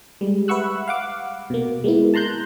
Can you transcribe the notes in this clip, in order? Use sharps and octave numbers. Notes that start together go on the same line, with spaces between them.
G3 G#3
B4 E5 F#5 C#6 E6 F#6
F5 F#5 D6
B2 A#3
G#3 A#3 B3 E4
A5 A#5 C6 F#6 G6